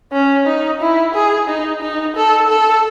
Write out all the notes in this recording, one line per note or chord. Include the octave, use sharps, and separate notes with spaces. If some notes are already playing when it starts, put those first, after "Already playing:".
C#4
D#4
E4
G#4
D#4
D#4
A4
A4